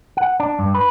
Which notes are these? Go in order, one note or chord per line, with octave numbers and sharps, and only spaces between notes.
F#5
D4
G2
B4